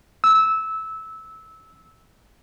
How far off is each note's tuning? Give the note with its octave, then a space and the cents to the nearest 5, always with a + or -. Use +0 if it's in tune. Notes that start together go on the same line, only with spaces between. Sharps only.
E6 -20